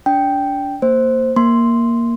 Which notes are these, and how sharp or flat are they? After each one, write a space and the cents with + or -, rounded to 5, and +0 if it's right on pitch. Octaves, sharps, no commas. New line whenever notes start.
D4 -30 G5 +0
A#3 -20 C5 +0
A#3 +0 C6 +0